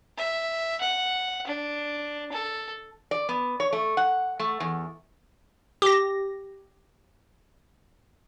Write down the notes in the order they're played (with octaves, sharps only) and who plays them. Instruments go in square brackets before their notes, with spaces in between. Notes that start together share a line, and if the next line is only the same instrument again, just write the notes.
[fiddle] E5
F#5
D4
A4
[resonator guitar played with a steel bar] D5
B3
C#5
A3
F#5
A3
E2
[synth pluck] G4 A#6